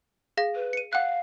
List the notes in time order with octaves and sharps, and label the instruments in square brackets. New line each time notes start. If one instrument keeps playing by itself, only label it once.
[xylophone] G#4 F5 A#6
[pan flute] B4
[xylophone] C#7 D#7
[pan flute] F5 [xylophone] F#5 F#6